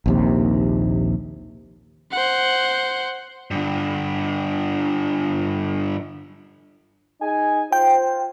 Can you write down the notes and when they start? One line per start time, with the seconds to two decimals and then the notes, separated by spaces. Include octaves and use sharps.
0.06 A#1 D#2 C3
2.12 C5 F#5
3.51 G2 D3
7.22 D#4 G#4 G#5
7.72 F4 C5 G5